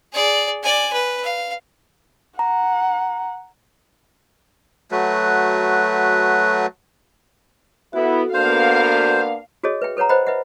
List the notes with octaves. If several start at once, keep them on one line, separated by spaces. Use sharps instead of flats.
G#4 D5
D5 G#5
B4
F5
F#5 A#5
F#3 A3 F#4 B4
B3 E4 F#4 A4
A#3 B3 D4 C5 F5
F#4 G#4 A4 C#5 D#5
B4 E5 G5
A4 B4 C#5 F#5 A#5
B4 C5 D#5 F#5 G5 B5
B4 D#5 E5 F#5